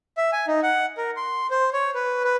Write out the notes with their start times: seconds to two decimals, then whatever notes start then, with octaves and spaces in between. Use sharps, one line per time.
0.17 E5
0.32 G#5
0.47 D#4
0.63 F#5
0.97 A#4
1.17 C6
1.50 C5
1.73 C#5
1.94 B4
2.24 B4